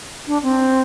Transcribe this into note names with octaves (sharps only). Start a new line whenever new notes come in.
D4
C4